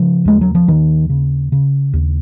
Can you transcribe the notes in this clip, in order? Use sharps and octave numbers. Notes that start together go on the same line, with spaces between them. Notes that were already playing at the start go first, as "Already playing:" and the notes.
Already playing: C#3 F3
D#2 G#3
F#3
F3
D#2 D#3
C#3
C#3
D#2